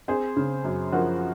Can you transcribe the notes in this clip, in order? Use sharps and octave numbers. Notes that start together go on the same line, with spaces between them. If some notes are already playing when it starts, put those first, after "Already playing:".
C4 G#4 C5
C#3
F#2
F3 F#4 A#4